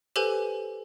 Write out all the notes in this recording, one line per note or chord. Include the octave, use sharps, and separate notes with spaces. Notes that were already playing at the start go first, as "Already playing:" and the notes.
G4 A4 B4 C5 G#5